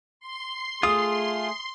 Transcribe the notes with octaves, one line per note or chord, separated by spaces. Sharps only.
C6
A3 F4 G#4 D#6